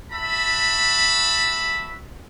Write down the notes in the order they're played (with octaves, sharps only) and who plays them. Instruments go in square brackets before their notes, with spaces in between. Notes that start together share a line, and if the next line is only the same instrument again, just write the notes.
[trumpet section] F#4 E5 A5 B5